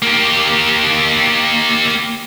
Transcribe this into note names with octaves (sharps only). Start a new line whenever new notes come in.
A#3 G4